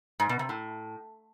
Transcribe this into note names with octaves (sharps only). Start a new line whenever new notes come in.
G#2
B2
C3
A2